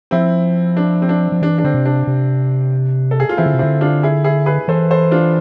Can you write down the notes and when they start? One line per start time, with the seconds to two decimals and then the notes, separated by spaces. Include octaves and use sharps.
0.11 F3 C4 E4
0.77 D4
1.02 C4
1.09 D4
1.32 F3
1.42 E3 D4
1.58 D4
1.64 D3 C4
1.74 C3
1.86 D4
2.07 C3
3.11 A4
3.20 G#4
3.29 F4
3.37 E3 C4 E4
3.46 D3
3.54 C3
3.59 D3 C4 E4
3.81 D4 F4
4.03 E4 G#4
4.24 E4 G#4
4.46 G#4 B4
4.68 E3 A4 C5
4.91 A4 C5
5.11 D4 F4